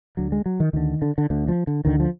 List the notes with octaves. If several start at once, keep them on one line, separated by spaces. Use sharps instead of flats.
D2 D3 F#3
G#3
F#3
D#3
D2 D3 D#3
D3
D3
D2 D3
F3
D3
D2 D3 D#3
F3